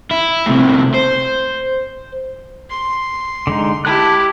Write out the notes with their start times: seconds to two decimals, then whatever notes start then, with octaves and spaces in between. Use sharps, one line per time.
0.11 E4
0.46 A2 C3
0.94 C5
2.70 C6
3.47 D3 G#3 D#4
3.85 E4 G4 A5 F#6